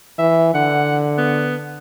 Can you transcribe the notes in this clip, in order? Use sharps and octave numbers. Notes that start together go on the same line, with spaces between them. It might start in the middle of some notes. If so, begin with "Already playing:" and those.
E3 E5
D3 F#5
B3